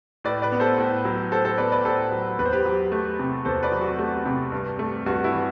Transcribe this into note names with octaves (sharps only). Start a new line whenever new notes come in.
A2 B4 D5
B4 D5
B3
A4 C5
A2
F#3
A2 A4 C5
A4 C5
B3 B4 D5
B4 D5
A2 A4 C5
F#3
E2 B4
C5
G4 B4
F#3
A3
C3
E2 A4 C5
B4 D5
F#3
F#4
A3
C3
G2
A3
G2 F#4
E4
E3